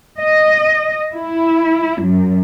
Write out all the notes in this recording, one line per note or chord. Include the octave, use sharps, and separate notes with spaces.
D#5
E4
F#2